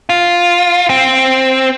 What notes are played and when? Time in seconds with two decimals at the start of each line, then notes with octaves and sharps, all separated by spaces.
0.09 F4
0.90 C4